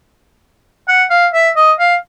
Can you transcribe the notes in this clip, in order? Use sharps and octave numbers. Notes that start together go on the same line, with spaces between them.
F#5
F5
E5
D#5
F5